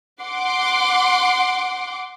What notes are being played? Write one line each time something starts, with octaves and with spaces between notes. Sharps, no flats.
F#5 C6 D6